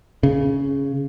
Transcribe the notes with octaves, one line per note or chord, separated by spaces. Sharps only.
C#3